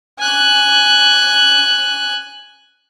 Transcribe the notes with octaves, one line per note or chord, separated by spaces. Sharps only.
G#5 F#6